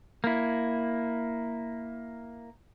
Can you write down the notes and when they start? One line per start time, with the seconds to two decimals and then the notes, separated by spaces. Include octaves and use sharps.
0.24 A#3 E4